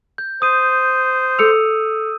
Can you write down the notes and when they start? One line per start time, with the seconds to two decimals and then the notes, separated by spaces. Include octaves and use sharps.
0.18 G6
0.42 C5 D#6 D#7
1.39 A4 E6 C#7 F7